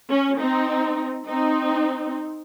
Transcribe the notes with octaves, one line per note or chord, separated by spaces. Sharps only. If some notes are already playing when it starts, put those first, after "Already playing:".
C#4
C4 D#4
C4 D#4